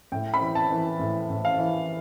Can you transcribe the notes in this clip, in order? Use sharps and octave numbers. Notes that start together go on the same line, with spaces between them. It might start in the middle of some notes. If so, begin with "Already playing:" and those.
A2 G5
B5
E3
A5
E3
A2
A2
F5
E3